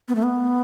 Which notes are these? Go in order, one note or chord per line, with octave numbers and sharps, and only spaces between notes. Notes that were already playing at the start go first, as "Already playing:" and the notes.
B3
A3
B3